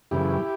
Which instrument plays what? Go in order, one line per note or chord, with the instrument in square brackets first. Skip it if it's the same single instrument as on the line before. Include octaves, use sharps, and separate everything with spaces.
[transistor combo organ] F#2 C#3 E3 E4 G4